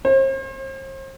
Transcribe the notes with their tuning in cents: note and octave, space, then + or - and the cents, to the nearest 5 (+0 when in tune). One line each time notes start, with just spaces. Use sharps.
C5 +40